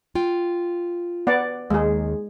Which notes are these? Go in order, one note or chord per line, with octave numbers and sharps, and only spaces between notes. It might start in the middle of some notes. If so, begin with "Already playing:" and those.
F4 G5
B3 D5 F#5
D#2 G#3 G#4